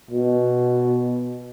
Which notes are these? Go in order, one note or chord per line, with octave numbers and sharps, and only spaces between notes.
B2